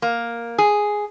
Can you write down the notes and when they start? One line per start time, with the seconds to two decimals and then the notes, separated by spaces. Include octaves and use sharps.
0.02 A#3
0.58 G#4